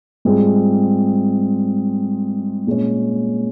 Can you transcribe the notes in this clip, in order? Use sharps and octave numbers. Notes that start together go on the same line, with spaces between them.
G#2 G3 C4 F4 G#4
A#2 G#3 C#4